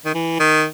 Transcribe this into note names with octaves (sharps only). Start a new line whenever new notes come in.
D#3
E3
D#3